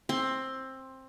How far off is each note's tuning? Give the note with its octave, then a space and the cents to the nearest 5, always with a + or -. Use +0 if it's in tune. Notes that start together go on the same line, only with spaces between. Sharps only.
C4 +15 C6 +10